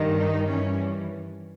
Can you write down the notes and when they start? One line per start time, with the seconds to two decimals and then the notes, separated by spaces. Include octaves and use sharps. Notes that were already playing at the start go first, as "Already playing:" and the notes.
Already playing: G2 D#3
0.18 D#4
0.50 G2 E3 C#4